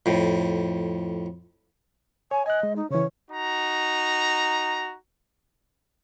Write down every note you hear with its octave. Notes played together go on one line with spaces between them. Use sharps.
F2 A2
C#5 G#5
D#5 G#5 F#6
G#3
D#4
C#3 E3 C#5
D#4 F#4 A#5